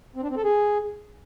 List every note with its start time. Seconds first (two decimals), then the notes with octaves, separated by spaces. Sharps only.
0.15 C4
0.23 D4
0.30 C4
0.37 A4
0.44 G#4